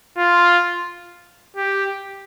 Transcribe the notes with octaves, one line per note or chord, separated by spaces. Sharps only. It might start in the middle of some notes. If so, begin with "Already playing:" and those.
F4
G4